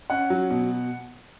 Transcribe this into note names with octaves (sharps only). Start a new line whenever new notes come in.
C#4 F#5
F#3
B2